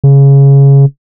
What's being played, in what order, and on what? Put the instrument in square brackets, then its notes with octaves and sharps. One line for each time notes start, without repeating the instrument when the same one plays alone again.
[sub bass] C#3